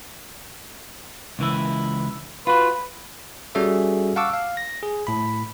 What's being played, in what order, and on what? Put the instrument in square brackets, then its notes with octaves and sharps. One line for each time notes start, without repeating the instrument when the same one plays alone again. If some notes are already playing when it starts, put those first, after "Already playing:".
[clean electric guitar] C#2 E3 E4
[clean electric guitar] F4 F#4 [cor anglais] B4
[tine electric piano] G3 C#4 F#4 G#4 A4 E5
F5 F#5 A5 C#6 D6 E6
F5
A#6
G#4
A2 B5